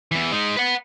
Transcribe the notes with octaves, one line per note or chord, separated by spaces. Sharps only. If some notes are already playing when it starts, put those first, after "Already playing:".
E2 E3
G#3 D#4
B4 F#5